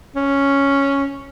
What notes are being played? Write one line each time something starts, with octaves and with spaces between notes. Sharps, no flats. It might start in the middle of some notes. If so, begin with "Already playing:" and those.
C#4